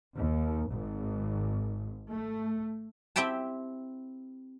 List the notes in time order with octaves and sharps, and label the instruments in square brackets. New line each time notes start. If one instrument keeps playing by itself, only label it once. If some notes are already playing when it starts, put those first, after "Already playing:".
[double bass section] D#2
G#1
A3
[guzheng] C4 E4 G4 G5 A5